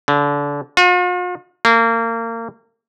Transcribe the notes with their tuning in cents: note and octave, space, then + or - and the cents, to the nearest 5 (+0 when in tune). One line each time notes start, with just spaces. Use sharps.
D3 -30
F4 +45
A#3 -30